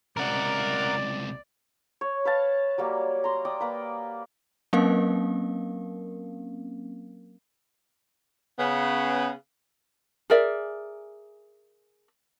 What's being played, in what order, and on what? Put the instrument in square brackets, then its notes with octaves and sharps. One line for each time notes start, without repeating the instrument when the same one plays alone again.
[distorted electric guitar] C#2 C3 [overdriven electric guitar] A#4 F#5 [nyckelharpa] D5
[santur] C#5
B4 F5 A5
F#3 G3 A#3
A#5 C6
D5 G5 D#6
A#3 B4
[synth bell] F#3 A#3 C4 C#4 A#4 F5
[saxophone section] C#3 B3
[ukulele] G#4 A#4 D5 E5